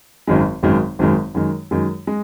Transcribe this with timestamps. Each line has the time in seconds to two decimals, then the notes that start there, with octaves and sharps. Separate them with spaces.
0.27 G#1 F#2 D#3 G#3
0.63 G#1 F#2 D#3 G#3
0.99 G#1 F#2 D#3 G#3
1.34 F#2 D#3 G#3
1.71 F#2 D#3 G#3
2.07 G#3